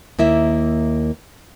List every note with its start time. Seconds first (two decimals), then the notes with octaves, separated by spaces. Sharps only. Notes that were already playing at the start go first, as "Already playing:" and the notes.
0.19 D#2 A#3 E4 E5